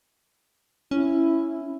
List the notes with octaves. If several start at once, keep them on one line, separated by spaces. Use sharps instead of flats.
C#4 E4